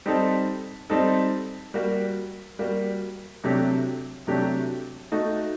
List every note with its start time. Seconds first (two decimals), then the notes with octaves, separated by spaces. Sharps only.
0.06 G3 C4 D#4 A4
0.90 G3 C4 D#4 A4
1.74 G3 A#3 F#4
2.59 G3 A#3 F#4
3.44 C3 F#3 A3 D4 G4
4.27 C3 F#3 A3 D4 G4
5.12 A3 D#4 F#4